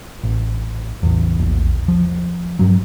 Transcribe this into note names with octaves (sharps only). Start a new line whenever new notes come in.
A1
A1 E2
A#1 E2
F3
G2 F#3